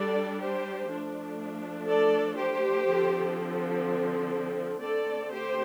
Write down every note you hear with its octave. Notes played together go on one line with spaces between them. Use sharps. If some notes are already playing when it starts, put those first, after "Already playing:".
Already playing: G3 D4 A4 D5
G4 C5
F3 A3 D4
A4 D5
G4 C5
D3 F3 C4
D3 A3 C4 A4 D5
G4 C5